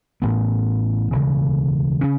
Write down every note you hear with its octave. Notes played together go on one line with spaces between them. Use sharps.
A1 A2 B3
E1 D2 C#3
C#3 C#4